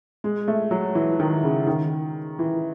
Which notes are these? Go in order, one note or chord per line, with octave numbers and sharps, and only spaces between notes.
G#3
A3
F#3
E3
D#3
C#3
D#3
E3